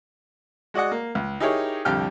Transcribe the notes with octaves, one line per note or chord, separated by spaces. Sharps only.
G#3 F#4 D5 D#5 F#5
A#3
C#2
D#4 E4 G4 G#4 A#4 C#5
C2 F2 D3 G4 G5 F6